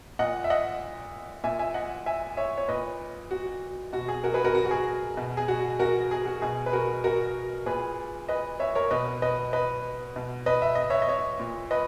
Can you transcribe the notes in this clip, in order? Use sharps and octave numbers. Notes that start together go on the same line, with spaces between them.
A#2 D#5 F#5
E5
D#5 F#5
A#2 E5 G#5
E5 G#5
D#5 F#5
E5 G#5
C#5 E5
C#5
A#2 B4 D#5
F#4
B2 F#4
G#4
F#4 A#4
G#4 B4
F#4 A#4
F#4
F#4
G#4
B2
G#4
F#4
F#4 A#4
G#4
F#4
B2 G#4
B4
F#4 A#4
F#4 A#4
A#2 G#4 B4
B4 D#5
C#5 E5
A#4 C#5
B2 B4 D#5
B4 D#5
B4 D#5
B2
B4 D#5
E5
D#5
C#5 E5
D#5
C#5 E5
A#2
B4 D#5